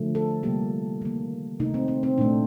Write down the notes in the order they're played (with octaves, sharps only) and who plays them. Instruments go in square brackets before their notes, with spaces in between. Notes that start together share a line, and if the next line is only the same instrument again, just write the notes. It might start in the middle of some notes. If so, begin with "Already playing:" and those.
Already playing: [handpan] D3 F3 A3
A4
C3 G3 A#3 G4
D#3 A#3
C3 D#3 A3 D#4
C4
C4
C4
A#2 A3 D4